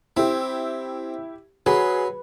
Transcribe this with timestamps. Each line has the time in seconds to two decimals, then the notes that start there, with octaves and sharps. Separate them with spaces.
0.17 C4 E4 G4
1.66 F#3 G#4 B4